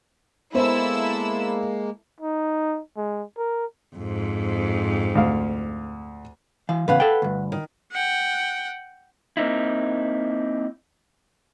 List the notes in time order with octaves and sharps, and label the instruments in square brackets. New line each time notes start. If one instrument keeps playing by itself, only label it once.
[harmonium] G#3 A#3 [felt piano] B3 C5 [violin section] E4 A4 E6
[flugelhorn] D#4
G#3
A#4
[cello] F2 G#2
[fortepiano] D2 F5
[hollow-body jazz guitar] E3 F5
[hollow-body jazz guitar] E2 C#3 [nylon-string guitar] B4 F5 F#5
[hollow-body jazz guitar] A4 G5
D2 G2
[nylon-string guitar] D#3
[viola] F#5 G5
[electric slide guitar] A#3 C4 D#4 E4